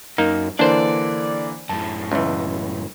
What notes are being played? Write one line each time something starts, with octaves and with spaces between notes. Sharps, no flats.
F#2 A#3 D#4
D3 E3 A#3 D4 C5 D5
F#2 A2 A5
C#2 E3